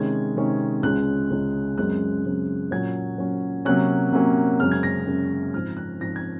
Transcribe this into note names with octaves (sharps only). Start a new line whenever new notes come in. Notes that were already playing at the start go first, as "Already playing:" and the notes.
Already playing: C3 D#3 G#3 C#4 G#6
C3 D#3 G#3 C#4
C#2 C#3 G#3 F#6
C#2 C#3 G#3
F#2 C#3 G#3 C4 F#6
F#2 C#3 G#3 C4
A#2 F#3 C#4 G#6
A#2 F#3 C#4
C3 F#3 A#3 C#4 F#6
C3 F#3 A#3 C#4
F#2 C#3 G#3 C#4 F6
G#6
A#6
F#2 C#3 G#3 C#4
G#2 F3 C4 F6
F#6
G#2 F3 C4 A#6
G#6